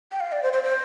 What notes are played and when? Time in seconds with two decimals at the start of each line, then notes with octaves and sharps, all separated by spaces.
0.12 G5
0.20 F5
0.32 D5
0.43 C5
0.53 C5
0.63 C5